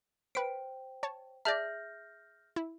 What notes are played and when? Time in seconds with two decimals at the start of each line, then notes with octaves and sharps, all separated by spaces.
0.35 B4 C5 G5 B6 D7
1.03 C#5 A5
1.45 G#4 D5 E5 A5 F6 G6 A#6
2.56 E4